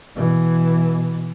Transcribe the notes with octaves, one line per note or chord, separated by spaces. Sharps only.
B2 E3